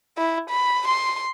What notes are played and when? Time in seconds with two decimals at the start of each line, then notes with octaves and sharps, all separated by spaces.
0.18 E4
0.50 B5
0.88 C6